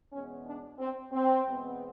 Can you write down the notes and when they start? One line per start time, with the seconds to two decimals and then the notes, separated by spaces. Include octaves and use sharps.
0.12 E2 B2 G#3 B3 C#4
0.46 D4
0.79 C4
1.12 C4
1.46 E2 B2 G#3 B3